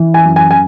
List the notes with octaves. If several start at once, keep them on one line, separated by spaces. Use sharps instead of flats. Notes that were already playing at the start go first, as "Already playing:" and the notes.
Already playing: E3
G#5
F#2
G#5
G#5